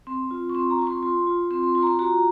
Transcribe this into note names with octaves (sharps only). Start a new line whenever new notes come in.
C4 C6
F4
C#6
C4 C6
A#5
F4 C#6
C6
F4 C6
F4
C4 C6
C6
F4 C6
A#5
C6
F#4 A#5